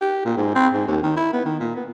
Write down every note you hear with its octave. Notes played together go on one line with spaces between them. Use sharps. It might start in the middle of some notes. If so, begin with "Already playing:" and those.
G4
A#2
G#2
C4
G#2
D#2
D#3
E4
B3
D#3
A#2
B3